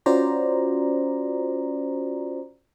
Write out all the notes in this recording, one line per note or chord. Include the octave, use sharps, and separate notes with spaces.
C#4 F4 F#4 C5 D5 A#5